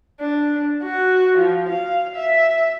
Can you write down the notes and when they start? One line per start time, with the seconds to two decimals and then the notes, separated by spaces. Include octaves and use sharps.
0.20 D4
0.83 F#4
1.38 F3
1.69 F5
2.15 E5